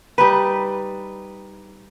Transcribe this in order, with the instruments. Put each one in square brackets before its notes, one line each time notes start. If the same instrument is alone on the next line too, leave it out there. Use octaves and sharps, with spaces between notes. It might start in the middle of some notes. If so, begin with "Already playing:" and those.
[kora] G3 D#4 B4